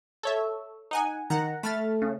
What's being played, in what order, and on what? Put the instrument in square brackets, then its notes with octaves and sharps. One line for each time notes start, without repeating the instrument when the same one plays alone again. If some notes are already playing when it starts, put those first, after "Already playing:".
[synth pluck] A4 C#5 E5
D#4 F#5 G#5
[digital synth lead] D#3 [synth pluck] F#5 A#5
[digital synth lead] A3 [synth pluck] B5 F6 A6
[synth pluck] C#3